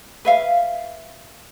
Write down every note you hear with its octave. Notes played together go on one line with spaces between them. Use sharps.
B4 E5 F5